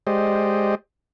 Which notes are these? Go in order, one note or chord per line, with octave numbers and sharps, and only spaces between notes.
G#3 G4 C5 D5 D#5